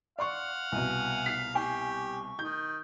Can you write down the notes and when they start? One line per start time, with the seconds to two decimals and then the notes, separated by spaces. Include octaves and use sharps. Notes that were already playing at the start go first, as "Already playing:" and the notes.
0.19 D5 F5 F#5 C6 C#6
0.72 C2 B2 G#5
1.26 B6 C7
1.55 G4 G#5 C#6
2.39 D#3 G6